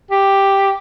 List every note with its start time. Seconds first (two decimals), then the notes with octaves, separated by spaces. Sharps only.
0.11 G4